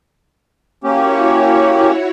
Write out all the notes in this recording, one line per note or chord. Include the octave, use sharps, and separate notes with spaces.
A#3 C#4 E4 F#4 G4 C#5